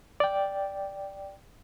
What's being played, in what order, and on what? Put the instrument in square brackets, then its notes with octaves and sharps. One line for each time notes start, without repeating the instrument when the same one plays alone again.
[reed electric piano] D5 G5